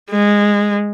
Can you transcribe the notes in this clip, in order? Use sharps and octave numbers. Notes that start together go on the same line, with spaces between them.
G#3